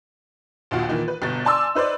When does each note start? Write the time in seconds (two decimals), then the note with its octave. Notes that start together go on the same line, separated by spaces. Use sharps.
0.71 A#1 D#2 F4 F#4
0.88 A#2 D#3 E3
1.08 B4
1.22 G1 B2 A6
1.45 D5 G#5 A5 C6 D6 E6
1.75 D#4 B4 C5 D5